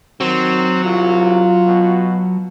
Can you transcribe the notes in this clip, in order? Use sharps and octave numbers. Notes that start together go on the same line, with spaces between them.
D#3 F#3 C4
C2 F4
B2